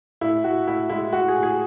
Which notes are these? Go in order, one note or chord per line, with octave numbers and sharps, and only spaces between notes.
A2 E4
A2 F#4
A2 E4
G#3 E4
A2 F#4
G#4
A2
G#4